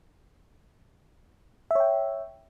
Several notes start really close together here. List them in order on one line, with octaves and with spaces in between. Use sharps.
E5 C#5 G5